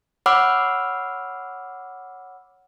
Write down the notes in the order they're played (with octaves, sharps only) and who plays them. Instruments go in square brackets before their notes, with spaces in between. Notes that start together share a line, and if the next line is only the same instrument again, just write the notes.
[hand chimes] C#5 F#5 B5 D6 E6 F6